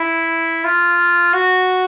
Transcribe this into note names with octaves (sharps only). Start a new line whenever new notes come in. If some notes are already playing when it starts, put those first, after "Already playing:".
Already playing: E4
F4
F#4